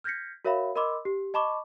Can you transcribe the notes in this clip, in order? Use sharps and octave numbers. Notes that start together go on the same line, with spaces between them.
F6 G6 G#6 A#6 B6 C#7
F#4 A#4 C#5 E5 F5 B5
A#4 D#5 B5 C6 D6 E6
G4
D#5 A5 B5 C#6 D6